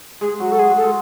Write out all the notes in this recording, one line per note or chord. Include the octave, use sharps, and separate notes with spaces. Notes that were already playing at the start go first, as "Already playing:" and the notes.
G#3 G#4
F#3 F#4
A4
G#3 G#4
G#3
A4
G#3